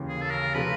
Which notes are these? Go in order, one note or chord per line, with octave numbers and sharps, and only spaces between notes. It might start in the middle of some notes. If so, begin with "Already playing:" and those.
Already playing: D#2 C#3 E3
G#4
A4
A#4
C3 F3 A3 B4